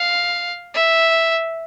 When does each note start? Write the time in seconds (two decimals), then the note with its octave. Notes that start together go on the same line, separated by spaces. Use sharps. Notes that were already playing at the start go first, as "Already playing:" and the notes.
Already playing: F5
0.74 E5